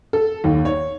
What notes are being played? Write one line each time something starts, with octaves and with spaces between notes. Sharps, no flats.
A4
D#2
C#5